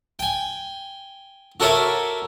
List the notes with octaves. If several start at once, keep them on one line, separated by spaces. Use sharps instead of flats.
G5 G#5
F#4 A4 A#4 C#5 D5 E5